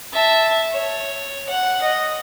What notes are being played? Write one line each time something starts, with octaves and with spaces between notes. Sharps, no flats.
E5 A5
C#5
F#5
D#5